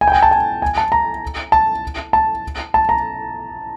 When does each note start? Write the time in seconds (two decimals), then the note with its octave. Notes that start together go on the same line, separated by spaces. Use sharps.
0.01 G#5
0.08 G5
0.12 G#5
0.23 A5
0.31 G#5
0.62 G#5
0.78 A5
0.92 A#5
1.52 A5
2.13 A5
2.74 A5
2.89 A#5